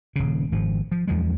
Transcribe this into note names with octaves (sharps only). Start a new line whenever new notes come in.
D#1 C#3
G#1 F3
F3
E2 F3 F#3 G#3